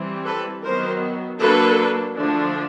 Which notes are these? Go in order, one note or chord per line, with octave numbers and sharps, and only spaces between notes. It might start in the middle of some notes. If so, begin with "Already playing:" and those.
Already playing: E3 G3 C4
A4 B4
D#3 F#3 B3 A#4 C5
F#3 A#3 D4 A4 B4
D3 F3 A3 D4